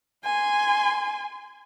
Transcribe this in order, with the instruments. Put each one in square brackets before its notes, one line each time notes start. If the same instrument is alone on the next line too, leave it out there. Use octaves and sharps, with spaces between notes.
[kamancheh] G#5 C6